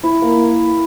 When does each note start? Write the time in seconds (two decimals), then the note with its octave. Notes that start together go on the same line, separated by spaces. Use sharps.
0.04 E4
0.22 A#3